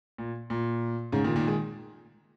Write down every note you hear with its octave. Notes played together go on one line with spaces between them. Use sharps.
A#2
A#2
G#2 C#3
A#2 D#3
A#2 D#3
D#3 G#3